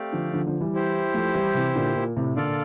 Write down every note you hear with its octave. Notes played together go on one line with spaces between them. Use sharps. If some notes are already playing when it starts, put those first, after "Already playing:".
Already playing: A3 C4 G4 D5 F5
D3 F3
D3 F3
D3 F3
E3 G3
E4 G4 C5
F3 A3
E3 G3
C3 E3
A#2 D3
A#2
A2 C3
A#2 D3 F4 A4 D5 F5